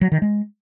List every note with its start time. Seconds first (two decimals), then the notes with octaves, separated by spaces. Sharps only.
0.01 F#3
0.12 D#3
0.22 G#3